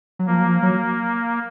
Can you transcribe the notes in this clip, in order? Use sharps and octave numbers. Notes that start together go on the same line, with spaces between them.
F#3
F3 A#3
F#3
F3
F#3